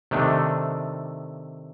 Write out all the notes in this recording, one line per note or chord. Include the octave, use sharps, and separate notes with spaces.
C3 D#3 A3 D4